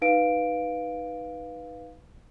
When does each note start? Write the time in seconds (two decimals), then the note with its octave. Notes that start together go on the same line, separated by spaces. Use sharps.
0.02 D#4 B4 F5 D7